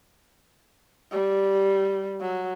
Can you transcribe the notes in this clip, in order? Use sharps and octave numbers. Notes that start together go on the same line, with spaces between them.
G3
F#3